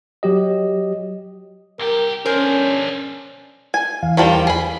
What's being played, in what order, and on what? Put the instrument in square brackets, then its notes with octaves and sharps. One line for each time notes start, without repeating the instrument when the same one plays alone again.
[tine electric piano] F#3 G4 D#5
[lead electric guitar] C2 G4 [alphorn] A#4
[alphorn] C#4 [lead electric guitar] D4 G#4 [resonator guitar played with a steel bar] A#4 C5
[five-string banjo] G#5
[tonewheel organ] E2 E3 F5
[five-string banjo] D#3 F3 G3
G#4 B5